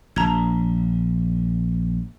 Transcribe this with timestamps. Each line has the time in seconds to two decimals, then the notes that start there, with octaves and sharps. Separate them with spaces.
0.16 A#1 A5 A#5 G#6